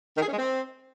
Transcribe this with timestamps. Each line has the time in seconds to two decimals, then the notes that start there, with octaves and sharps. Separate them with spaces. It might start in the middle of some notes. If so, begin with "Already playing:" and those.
0.17 D#3
0.22 G#4
0.28 C#4
0.33 G#3
0.38 C4